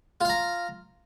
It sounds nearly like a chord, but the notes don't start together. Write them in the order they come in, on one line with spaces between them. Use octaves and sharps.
F4 F5 A#5